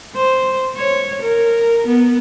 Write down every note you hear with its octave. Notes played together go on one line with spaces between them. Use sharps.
C5
C#5
A#4
B3